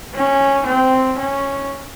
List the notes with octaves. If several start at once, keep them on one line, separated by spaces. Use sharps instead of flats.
C#4
C4
C#4